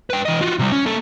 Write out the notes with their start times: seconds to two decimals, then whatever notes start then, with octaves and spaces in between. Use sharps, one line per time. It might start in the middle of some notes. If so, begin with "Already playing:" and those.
0.10 B4 G5
0.25 E3 D#5
0.41 F4 F#4
0.59 C3 G3
0.72 C#4
0.86 A#3 A4